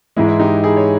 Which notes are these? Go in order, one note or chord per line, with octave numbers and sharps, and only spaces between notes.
G#2 E3 G#3 E4
E4
D#4 G4
E4 G#4
C#5